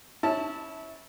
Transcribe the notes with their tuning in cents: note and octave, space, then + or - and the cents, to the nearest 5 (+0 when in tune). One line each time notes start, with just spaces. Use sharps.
C#4 +0 E4 -25 A5 +0